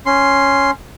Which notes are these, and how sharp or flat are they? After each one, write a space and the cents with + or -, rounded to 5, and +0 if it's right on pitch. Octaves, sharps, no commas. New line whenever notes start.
C#4 +0 C6 +0